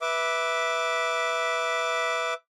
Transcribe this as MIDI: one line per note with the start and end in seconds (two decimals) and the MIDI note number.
0.02 2.34 71
0.02 2.34 76
0.02 2.34 86